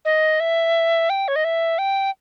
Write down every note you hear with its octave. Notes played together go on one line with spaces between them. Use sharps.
D#5
E5
G5
C#5
D#5
E5
G5